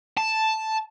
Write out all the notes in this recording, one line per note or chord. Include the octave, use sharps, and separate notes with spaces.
A5